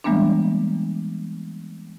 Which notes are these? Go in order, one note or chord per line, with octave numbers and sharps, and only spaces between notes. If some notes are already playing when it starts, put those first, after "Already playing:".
E3 G3 G#3 A#3 B3 D4